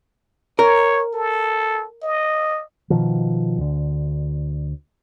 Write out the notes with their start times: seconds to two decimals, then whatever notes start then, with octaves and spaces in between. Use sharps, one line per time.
0.59 A#4 C#5
1.14 A4
2.03 D#5
2.90 B2 D#3 F3
3.58 D2 D3